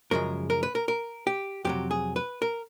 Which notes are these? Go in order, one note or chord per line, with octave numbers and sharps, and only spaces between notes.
F#2 C#3 F3 G#3 A#4
A#4
B4
A#4
A#4
G4
F2 C3 D#3 F#3 G4
G#4
B4
A#4